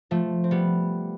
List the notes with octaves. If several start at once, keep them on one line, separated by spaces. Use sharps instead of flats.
F3 A3
C4
G3 B3